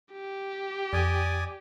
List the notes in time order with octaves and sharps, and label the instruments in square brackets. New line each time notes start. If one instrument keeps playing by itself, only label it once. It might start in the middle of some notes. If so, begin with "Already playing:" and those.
[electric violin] G4
[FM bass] F2 [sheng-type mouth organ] D5 G#5 D#6